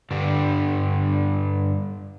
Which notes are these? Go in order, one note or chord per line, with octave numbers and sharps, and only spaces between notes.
G2 D3 G3